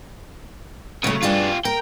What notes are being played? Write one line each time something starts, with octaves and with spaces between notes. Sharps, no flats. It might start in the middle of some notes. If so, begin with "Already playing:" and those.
C#3 F#3 A3
G2 D4 F4 G4 G#4
A#4 G5